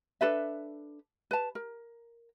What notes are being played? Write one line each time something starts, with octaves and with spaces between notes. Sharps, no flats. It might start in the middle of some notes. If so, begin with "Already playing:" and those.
D4 A4 B4 E5
B4 A5
A#4